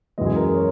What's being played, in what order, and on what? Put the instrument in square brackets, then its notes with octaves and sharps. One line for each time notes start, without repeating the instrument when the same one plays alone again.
[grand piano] F#2 E3 G#3 D#5
G#4
A#4
C#5